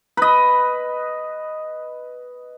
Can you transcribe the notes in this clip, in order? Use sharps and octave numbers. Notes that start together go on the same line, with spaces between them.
B4 D#5